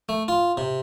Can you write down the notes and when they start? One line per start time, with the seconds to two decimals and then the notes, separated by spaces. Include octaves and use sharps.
0.09 A3
0.28 F4
0.57 C3